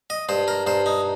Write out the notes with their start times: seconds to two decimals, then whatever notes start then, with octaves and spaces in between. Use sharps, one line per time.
0.10 D#5
0.29 G2 C5
0.48 A#4
0.67 G2 C5
0.86 D#4